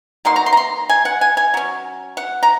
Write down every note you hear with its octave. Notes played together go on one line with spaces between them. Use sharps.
F#3 A#3 D#4 C6
A#5
C6
A#5
C6
G#5
F#5
G#5
G#5
F#3 C#4
F#5
A#5